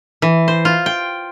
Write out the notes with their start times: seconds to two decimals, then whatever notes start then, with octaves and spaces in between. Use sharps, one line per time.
0.22 E3
0.48 C5
0.65 F4
0.86 G5